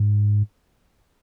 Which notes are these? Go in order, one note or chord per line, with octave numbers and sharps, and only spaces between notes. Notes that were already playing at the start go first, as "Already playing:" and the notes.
Already playing: G#2